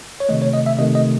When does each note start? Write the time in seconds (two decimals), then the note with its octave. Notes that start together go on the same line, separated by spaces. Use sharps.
0.20 C#5
0.29 C3 D#3 A3 D#5
0.42 C#5
0.53 D#5
0.66 E5
0.78 C3 D#3 A3 D#5
0.95 D#5